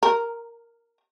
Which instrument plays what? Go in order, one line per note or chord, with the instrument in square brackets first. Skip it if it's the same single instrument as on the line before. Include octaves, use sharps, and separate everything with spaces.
[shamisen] A#4